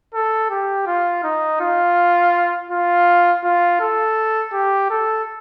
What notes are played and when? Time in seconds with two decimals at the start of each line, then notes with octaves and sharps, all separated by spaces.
0.14 A4
0.50 G4
0.87 F4
1.23 D#4
1.60 F4
2.70 F4
3.44 F4
3.80 A4
4.53 G4
4.90 A4